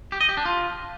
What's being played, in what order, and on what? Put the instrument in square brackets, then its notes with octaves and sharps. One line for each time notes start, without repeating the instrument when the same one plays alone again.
[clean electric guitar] G4
D#5
G4
D4
F4